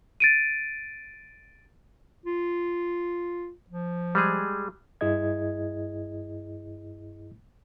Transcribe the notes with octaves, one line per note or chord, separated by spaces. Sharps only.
A6 D7 D#7
F4
F3
G3 G#3 G#4
G2 E4 G#4 D#5 G#6